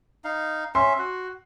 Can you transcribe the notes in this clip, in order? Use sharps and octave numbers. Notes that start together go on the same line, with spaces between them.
D#4 F5
C#4 E5 C6
F#4